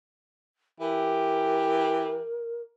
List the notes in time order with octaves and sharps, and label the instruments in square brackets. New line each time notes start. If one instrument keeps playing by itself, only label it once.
[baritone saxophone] E3 [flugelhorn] G4 [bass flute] A#4